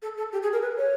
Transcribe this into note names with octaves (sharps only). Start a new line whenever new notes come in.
A4
A4
G4
G#4
A#4
B4
C#5